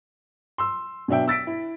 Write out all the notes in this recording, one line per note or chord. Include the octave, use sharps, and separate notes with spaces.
C6 E6
B2 F#3 D4 E5 G5
E6 A6 B6 D7
E4